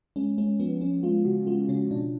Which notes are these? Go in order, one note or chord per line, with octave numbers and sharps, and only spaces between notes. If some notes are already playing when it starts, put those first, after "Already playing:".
G#3 C#4
G#3 C#4
F3 B3
F3 C#4
G#3 F4
C#3 F#4
G#3 F4
C#3 C#4
B2 D4